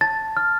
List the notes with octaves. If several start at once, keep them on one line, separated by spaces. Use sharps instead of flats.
A5 A6
F6